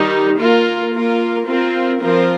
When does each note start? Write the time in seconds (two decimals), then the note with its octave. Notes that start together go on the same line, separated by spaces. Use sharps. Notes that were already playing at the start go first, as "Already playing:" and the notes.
Already playing: D#3 G3 D#4 G4
0.39 A#3 F4 A#4
0.93 A#3 F4 A#4
1.47 C4 F4 A#4
2.02 F3 C4 F4 A#4